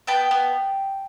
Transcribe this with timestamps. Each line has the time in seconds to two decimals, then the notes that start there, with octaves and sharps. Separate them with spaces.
0.07 B3 G5 A5
0.31 B3